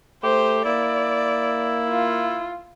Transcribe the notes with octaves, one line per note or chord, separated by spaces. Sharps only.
A3 G4 C5
A#3 E4 D5
F4